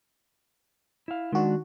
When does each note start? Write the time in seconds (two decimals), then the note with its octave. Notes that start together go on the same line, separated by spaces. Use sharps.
1.08 E4 F5
1.33 D#3 G#3 D4 F#4